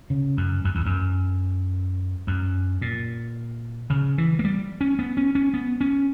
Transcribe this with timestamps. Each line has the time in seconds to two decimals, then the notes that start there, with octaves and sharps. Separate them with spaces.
0.10 C#3
0.37 F#2
0.65 F#2
0.75 E2
0.86 F#2
2.27 F#2
2.82 A#2
3.90 C#3
4.18 E3
4.39 A#3
4.44 G3
4.81 C#4
4.99 B3
5.17 C#4
5.35 C#4
5.54 B3
5.81 C#4